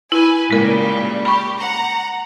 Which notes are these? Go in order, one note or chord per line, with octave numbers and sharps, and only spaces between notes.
E4 B4 G#5
A#2 C#3 G3 G#3 A#4
G4 B5 C#6
F#5 A#5